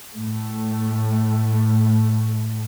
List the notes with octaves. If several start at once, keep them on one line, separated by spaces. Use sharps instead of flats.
A2 A3